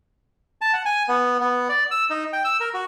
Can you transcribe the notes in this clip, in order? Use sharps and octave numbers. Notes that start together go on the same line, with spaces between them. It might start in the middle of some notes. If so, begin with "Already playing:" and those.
A5
F#5
G#5
B3
B3
D5
E6
D#4
G5
E6
A#4
F#4